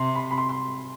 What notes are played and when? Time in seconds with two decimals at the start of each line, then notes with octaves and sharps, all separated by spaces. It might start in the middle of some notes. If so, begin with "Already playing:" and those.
Already playing: C3 C6
0.15 B5
0.31 B5
0.38 C6
0.49 C6